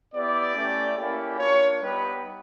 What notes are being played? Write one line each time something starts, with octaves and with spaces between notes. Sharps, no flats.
B3 E4 G4 D5
A3 C#4 E4 G4
A#3 C#4 E4 G4
A#3 D4 F4 C#5
G3 B3 D#4 G4 B4